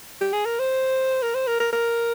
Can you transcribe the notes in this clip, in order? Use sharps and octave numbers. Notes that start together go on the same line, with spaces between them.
G4
G#4
A#4
C5
A#4
C5
A#4
A#4
A#4